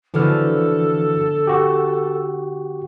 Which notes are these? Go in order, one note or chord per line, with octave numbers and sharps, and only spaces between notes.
D3 E3 F3 B3 F#4 A4 F6
F#4 G4